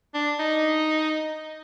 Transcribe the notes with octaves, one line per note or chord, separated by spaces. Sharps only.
D4
D#4